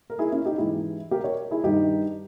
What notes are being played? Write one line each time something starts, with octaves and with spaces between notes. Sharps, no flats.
A#4
E4 G#4
C#4 E4
D#4 G4
G#2 E3 E4 G#4
G4 A#4
A#4 C#5
E4 G#4
G2 D#3 D#4 G4